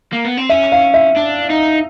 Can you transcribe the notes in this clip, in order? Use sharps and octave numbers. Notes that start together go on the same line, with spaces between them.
A#3
B3
C4
C#4 E5
F5
E5
D4
D#4